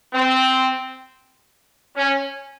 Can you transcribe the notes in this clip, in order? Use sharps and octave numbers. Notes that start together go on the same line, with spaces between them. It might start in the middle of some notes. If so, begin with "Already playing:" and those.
C4
C#4